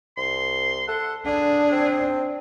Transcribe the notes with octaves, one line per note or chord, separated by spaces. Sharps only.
C2 C6
A4 F#5
D3 D4 G#4
C4